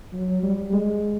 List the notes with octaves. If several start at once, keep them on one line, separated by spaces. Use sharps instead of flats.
F#3
G3
G#3